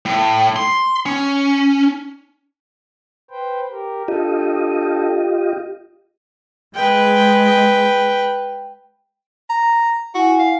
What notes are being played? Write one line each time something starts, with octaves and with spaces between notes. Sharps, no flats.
A2
C6
C#4
B4 C5 G5
G4 A#4
D4 F4 G4 A4 D#5
G#3 B4 G5
A#5
E4 F#4 F#5 G#5
F5